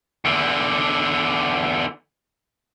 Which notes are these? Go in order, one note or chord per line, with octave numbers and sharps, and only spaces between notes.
E2 D3